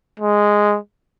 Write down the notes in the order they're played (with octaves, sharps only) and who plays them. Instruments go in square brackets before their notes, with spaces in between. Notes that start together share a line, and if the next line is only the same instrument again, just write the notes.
[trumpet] G#3